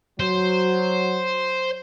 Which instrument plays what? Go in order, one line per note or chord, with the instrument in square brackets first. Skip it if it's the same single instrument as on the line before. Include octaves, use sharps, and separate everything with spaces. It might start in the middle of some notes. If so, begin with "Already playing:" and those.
[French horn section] F#3 [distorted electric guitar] C5